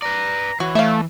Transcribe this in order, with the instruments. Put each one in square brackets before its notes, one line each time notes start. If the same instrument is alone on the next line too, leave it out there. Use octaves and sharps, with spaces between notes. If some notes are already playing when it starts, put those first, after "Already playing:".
[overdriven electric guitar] B4 D5 [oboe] A#5
[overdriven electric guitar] E3 [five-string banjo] F#4 [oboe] C#5
[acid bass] A3 [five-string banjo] E5 F5